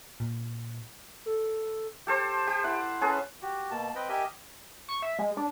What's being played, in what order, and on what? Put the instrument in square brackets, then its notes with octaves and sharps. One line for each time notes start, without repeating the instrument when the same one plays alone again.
[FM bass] A#2
[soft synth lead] A4
[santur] G4 A4 C5
G4
E4 F#5
C#4 G#4 A4 B4
[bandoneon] F#4 G4
B2 A#3 A5
C4 B4 D#5 G5
G4 A#4 D#5 E5 G#5
[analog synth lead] C#6
E5
G#3
D4